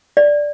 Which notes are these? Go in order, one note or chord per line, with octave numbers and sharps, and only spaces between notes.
D5